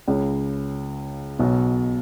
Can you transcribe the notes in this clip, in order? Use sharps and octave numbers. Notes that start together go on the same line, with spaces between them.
C#2 C#3
B1 B2